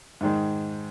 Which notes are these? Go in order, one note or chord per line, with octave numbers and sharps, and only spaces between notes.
G#2 D#3 G#3